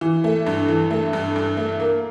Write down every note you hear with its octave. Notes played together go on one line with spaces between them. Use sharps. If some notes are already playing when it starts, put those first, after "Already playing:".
E3
A3
G2
E3
A3
G2
G2
A3
A#3